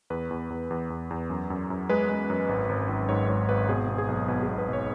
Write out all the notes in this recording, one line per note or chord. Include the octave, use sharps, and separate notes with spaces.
E2 B4
E2
E2
E2
E2
E2
F#2
F#2
F#2
G#3 B4
G#3
F#2
G#1
G#1
G#1
G#2 C#5
G#1 C#5
G#1 B4
B2 G#4
B2
G#4
B1
B2 B4
G#4
B2
B4
B1 C#5